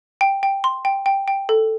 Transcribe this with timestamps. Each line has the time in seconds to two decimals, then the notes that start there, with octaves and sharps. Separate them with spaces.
0.21 G5
0.43 G5
0.64 C6
0.85 G5
1.06 G5
1.28 G5
1.49 A4